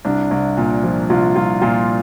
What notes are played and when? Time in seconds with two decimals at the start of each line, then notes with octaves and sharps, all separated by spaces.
0.05 C2 D4
0.31 C2
0.57 A#2
0.84 F3
1.10 C2 F4
1.36 C2 F4
1.61 A#2 F4